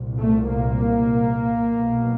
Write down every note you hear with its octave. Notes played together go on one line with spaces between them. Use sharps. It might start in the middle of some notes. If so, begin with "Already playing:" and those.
Already playing: C2 A#2
A3
A#3
B1 B2